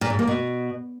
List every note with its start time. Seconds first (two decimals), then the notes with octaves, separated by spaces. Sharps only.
0.01 A#2
0.10 G#2
0.19 A#3
0.28 B2